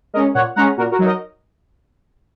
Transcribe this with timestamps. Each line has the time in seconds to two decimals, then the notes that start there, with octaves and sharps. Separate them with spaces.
0.14 G#3 C#4 A#4 D#5
0.34 A#2 C#5 F#5
0.56 G#3 C#4 F#5 A#5
0.77 A#2 F#4 A#4
0.91 F#4 A#4
0.99 F#3 D#4
1.06 A#4 D#5